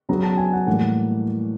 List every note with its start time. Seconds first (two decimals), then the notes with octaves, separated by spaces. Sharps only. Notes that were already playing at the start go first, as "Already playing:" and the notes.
0.09 C#3 F#3 B3 A#5
0.23 A5
0.37 G#5
0.53 F#5
0.67 A2 E3 G3 A#3 F#5